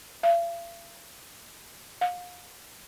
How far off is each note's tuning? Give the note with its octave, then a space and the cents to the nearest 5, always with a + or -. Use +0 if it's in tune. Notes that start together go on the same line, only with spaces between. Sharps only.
F5 -45
F5 +35